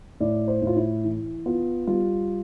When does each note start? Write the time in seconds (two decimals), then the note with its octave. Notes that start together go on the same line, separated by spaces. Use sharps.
0.20 A2 D5
0.48 C5
0.62 A2 F4
0.76 E4
1.04 E3
1.46 B3 F4
1.87 G3 F4